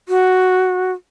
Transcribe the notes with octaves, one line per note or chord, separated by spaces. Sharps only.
F#4